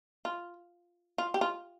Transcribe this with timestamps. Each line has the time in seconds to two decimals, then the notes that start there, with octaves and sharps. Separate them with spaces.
0.25 F4
1.18 F4
1.34 G4
1.41 F4